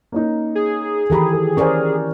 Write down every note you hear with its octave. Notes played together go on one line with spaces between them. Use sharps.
A#3 C#4 D#4
G#4
D#3 E3 G4 A4 A#5 B5
A4
C#4 A#4 C5 D5 G#5 C#6